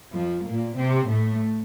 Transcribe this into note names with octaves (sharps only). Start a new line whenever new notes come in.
F2 F3
A#2 A#3
C3 C4
A2 A3